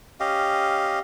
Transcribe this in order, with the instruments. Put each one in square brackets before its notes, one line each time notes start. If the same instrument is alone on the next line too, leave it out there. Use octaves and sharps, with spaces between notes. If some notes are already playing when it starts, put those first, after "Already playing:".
[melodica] C#4 G4 D#5 F5